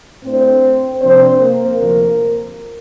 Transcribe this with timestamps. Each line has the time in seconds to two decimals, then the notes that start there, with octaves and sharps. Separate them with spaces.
0.24 A2 A3 C4 D4 C5
1.01 C3 F3 A#3 C4 D4 C5
1.40 A#3 A#4
1.78 D2 C3 F3 A#3